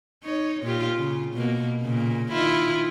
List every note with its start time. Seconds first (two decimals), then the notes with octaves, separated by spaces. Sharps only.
0.24 D#4 C#5
0.63 A#2 F4 G4
0.98 C#3
1.34 B2 A#3
1.82 A#2 C#3
2.32 D#3 E4 F4